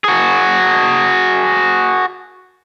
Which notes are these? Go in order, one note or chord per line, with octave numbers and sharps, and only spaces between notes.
F#4 G#4